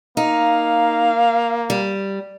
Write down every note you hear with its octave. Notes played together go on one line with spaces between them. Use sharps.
A#3 D#4 F5
G3